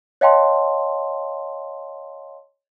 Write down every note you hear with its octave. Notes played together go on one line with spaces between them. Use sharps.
C#5 D#5 F5 G5 A5 C6